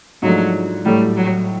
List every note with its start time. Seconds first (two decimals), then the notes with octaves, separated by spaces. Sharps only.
0.22 G#2 F3 F#3 A3 D4
0.85 A2 F#3 G3 A3
1.17 F#3